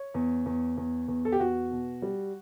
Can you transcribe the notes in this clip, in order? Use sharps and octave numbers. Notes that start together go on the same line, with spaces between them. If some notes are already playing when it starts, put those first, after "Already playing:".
Already playing: C#5
E2
E2
E2
E2
A4
G4
E2 F#4
B2
G3